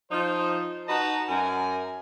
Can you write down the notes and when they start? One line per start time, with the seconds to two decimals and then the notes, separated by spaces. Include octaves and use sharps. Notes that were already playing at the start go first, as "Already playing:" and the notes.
0.11 F3 D#4 C5
0.87 D#4 F#4 B4 D#5 A5 A#5
1.28 F#2 A#4 G#5